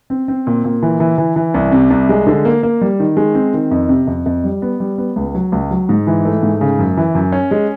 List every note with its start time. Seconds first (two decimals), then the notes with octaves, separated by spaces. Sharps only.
0.10 C4
0.28 C4
0.47 A#2
0.64 A#2
0.83 E3
1.00 E3
1.18 E3
1.36 E3
1.54 C2
1.72 C3
1.90 C2
2.09 G#3
2.27 D3
2.45 A#3
2.63 A#3
2.81 G3
3.00 D#3
3.17 G#3
3.35 C4
3.54 D#3
3.71 F2
3.89 C3
4.07 F2
4.26 F2
4.44 G3
4.62 B3
4.80 G3
4.98 B3
5.16 C#2
5.35 F#3
5.52 C#2
5.71 F#3
5.89 G#2
6.07 E3
6.25 A3
6.43 G#2
6.61 C#3
6.79 F#2
6.97 E3
7.15 F#2
7.32 C#4
7.51 G#3